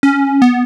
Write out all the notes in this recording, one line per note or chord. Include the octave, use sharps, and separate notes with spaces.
C#4
B3